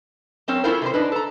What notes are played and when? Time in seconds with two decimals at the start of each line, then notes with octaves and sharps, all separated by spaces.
0.48 F#3 C4 C#4 A#4
0.64 C#4 E4 F4 A4 A#4 C5
0.82 C3 B4 C5
0.94 D4 D#4 B4
1.12 A4 A#5